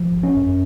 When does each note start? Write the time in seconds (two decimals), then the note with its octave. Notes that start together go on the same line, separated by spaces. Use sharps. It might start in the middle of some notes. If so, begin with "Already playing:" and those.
Already playing: F3
0.12 G#1
0.23 C#4
0.36 F#2